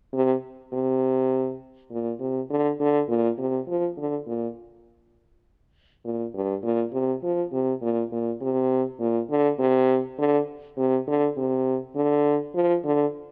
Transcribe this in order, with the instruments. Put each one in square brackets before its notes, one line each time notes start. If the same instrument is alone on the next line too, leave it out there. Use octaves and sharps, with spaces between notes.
[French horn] C3
C3
A#2
C3
D3
D3
A#2
C3
F3
D3
A#2
A#2
G2
A#2
C3
F3
C3
A#2
A#2
C3
A#2
D3
C3
D3
C3
D3
C3
D3
F3
D3